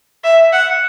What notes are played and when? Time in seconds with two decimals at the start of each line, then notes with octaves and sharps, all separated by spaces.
0.24 E5
0.53 F#5